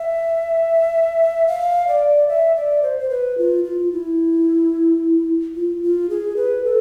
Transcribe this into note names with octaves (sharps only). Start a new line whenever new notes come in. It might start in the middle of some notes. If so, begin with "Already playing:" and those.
Already playing: E5
F5
D5
E5
D5
C5
C5
B4
F4
F4
E4
F4
F4
G#4
B4
A4